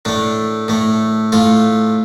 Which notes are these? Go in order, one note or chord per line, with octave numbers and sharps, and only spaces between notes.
A2 A3 D4
A2 A3
A2 A3 F4